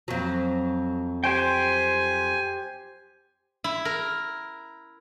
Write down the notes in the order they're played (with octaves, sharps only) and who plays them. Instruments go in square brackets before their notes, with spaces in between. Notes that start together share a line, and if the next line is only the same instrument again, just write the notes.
[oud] F2 F#3
[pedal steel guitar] G4 C5 G5 [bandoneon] G#5
[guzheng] E4
A#4